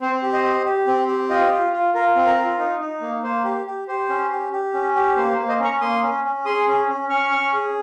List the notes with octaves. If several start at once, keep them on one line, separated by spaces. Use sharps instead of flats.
C4 C5
G4
C5 D#5
G4
G4
C4
G4
F4 D#5 G5
F4
F4
F4 A#4
C4
A#4
F4
D#4
D#4
A#3
A#3 C5
G4
G4
G4 C5
C#4
G4
G4
C#4
G4
A#3 C5
C5
A#3
C5 D#5
C#4
A#5 C#6
A#3 C6 D#6
C#4
C#4
G#4 C6 D#6
C#4
C#4
C#4 C#6 F6
C#4
G#4